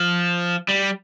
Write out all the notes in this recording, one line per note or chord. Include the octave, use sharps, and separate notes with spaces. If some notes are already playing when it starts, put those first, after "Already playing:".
Already playing: F3
G3